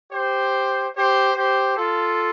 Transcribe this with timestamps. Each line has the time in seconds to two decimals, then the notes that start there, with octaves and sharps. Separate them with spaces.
0.12 G4 C5
0.95 G4 C5
1.37 G4 C5
1.77 F4 A4